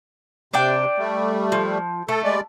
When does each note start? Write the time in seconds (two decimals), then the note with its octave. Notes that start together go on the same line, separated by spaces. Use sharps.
0.53 C3 D4 D5 G5
0.98 G3 A3
1.52 F3
2.09 A3 A4
2.23 G3 G#3 D5